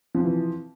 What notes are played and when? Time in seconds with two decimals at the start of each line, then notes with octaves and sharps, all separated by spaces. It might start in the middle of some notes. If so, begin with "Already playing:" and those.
0.15 F3
0.19 C3
0.24 E3